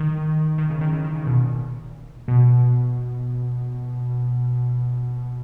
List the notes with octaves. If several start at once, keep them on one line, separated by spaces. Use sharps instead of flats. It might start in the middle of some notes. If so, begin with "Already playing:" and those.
Already playing: D#3
D#3
C#3
D#3
E3
D#3
C#3
B2
A#2
B2